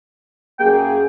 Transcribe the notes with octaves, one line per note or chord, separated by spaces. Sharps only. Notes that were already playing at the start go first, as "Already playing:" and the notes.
F#2 A#3 G#4 G5